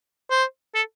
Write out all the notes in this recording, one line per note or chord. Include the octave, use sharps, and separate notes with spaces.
C5
A4